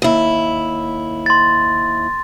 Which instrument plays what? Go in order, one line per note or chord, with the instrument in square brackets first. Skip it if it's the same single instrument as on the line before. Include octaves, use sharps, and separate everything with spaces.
[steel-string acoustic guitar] D#2 E4
[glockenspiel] C6 A6